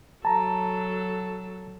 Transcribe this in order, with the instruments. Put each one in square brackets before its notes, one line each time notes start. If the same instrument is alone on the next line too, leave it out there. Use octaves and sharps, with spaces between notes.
[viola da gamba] F#3 A4 [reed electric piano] A5 A#5